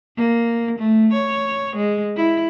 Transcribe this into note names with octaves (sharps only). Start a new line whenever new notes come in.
A#3
A3
C#5
G#3
E4